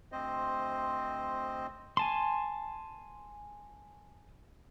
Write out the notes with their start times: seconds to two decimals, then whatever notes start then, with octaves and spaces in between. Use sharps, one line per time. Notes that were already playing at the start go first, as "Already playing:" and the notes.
0.12 D2 C4 C5 D#5
1.97 G#5 A5 C6